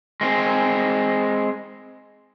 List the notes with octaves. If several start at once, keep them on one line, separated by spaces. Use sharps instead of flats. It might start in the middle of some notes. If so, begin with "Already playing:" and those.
G#3 C4